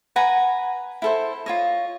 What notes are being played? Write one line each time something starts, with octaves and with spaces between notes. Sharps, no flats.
B4 F#5 G#5 A#5
E4 A4 C5
F4 C#5 D#5